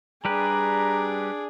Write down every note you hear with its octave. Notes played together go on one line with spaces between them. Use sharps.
G3 D4 G4 G#4 B4 A#5